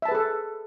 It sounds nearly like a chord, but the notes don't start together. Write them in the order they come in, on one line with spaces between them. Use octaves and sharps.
E5 A5 B4 G#4 A4